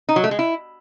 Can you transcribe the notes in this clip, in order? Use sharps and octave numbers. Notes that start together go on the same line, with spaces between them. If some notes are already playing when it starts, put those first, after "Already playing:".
D#4
F#3
A3
G#3
E4